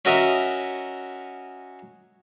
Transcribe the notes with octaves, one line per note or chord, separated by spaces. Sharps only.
C#4 F#4 A#4 D#5 E5 A#5